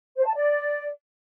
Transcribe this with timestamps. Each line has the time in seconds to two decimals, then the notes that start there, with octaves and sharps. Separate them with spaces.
0.16 C5
0.25 A5
0.34 D5